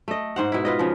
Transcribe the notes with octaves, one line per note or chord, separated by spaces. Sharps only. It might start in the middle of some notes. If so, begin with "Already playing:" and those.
A3 D#5
G#2 C5 F#5
B2 E4
F4 B4 D#5
C#3 F3